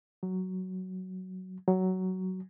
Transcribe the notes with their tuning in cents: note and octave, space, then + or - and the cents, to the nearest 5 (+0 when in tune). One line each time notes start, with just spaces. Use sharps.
F#3 +5
F#3 +10